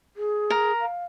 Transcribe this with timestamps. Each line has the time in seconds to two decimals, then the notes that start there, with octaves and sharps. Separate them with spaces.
0.17 G#4
0.50 A#4
0.80 F5